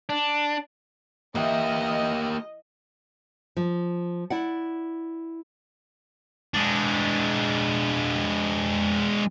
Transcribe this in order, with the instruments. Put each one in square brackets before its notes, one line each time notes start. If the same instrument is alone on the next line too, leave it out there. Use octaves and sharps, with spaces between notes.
[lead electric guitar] D4
[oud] E3 [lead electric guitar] A#3 G4 [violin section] D#5
[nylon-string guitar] F3
E4 D5 F#5
[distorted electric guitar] G#3 D4